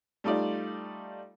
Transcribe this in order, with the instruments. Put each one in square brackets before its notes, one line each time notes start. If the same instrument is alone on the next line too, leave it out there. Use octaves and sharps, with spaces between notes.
[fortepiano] G3 A3 D#4 F4 D5